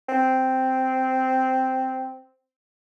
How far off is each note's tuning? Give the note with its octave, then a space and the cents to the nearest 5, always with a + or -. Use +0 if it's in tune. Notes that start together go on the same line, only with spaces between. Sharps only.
C4 -5